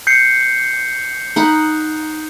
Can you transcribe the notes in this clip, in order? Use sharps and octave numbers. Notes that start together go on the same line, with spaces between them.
G6 C7 C#7
D#4 F#5 B5